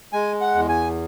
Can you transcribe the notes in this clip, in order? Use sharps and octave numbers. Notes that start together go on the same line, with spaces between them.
G#3 G#5
F#5
E2
G#5